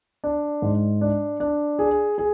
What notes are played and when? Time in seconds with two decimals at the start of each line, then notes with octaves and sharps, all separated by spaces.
0.24 D4
0.62 G#2
1.01 D4
1.40 D4
1.79 G#4
2.18 G#4